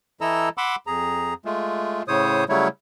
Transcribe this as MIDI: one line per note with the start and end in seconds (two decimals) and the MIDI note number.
0.21 0.49 52
0.21 0.49 64
0.21 0.49 69
0.21 0.49 75
0.21 0.49 82
0.21 0.49 88
0.58 0.76 78
0.58 0.76 83
0.58 0.76 84
0.58 0.76 86
0.58 0.76 88
0.87 1.34 41
0.87 1.34 68
0.87 1.34 82
1.45 2.02 56
1.45 2.02 57
1.45 2.02 65
2.08 2.44 45
2.08 2.44 49
2.08 2.44 72
2.08 2.44 73
2.08 2.44 87
2.49 2.68 49
2.49 2.68 54
2.49 2.68 55
2.49 2.68 57
2.49 2.68 64
2.49 2.68 73